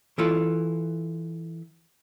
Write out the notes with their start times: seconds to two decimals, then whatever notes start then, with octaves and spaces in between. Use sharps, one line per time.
0.18 E3 E4 F4 A4